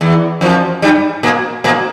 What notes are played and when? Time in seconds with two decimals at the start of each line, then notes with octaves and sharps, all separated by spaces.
0.01 E2 E3
0.41 F2 F3
0.82 G2 G3
1.23 A#2 A#3
1.64 A#2 A#3